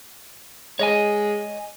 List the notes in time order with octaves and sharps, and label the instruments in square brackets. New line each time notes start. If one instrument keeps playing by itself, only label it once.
[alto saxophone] G#3 [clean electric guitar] C#5 D#5 G#5